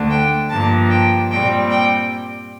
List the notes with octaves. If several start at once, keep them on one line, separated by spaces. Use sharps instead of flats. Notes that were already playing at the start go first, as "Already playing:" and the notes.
Already playing: D2 D3 A3 D4
G5
G2 F3 A#3 D4 A5
G5
A#2 G3 C4 G5
G5